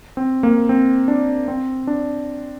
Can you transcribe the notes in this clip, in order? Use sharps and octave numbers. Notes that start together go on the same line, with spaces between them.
C4
A#3
C4
D4
C4
D4